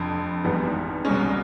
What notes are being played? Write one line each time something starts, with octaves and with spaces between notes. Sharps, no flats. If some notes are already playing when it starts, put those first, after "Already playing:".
Already playing: F1 F2 D3
G#1 G#2 E3 G3 B3
C2 B2 G#3 C#4